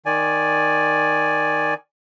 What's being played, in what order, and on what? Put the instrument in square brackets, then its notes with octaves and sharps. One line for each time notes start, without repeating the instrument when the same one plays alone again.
[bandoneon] D#3 D5 G#5